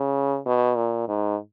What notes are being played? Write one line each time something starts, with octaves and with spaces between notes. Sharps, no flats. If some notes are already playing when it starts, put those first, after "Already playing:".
Already playing: C#3
B2
A#2
G#2